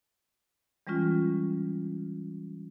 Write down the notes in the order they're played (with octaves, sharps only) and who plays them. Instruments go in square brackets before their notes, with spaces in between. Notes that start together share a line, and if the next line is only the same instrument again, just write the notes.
[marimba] E3 G3 G#3 C#4 F4